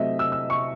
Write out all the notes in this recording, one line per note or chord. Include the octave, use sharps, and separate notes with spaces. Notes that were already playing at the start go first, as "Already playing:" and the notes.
Already playing: C3 F#3 A3 C4 D#5 E5
E6
E6
C#6